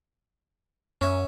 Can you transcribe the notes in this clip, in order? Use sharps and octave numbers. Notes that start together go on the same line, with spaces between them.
F#2 C#4 E5